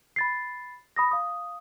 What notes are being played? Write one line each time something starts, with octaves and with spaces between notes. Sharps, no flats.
B5 A6 C7
B5 D#6 A#6
F5 D#6